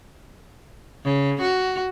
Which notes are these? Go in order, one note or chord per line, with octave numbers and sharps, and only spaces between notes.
C#3
F#4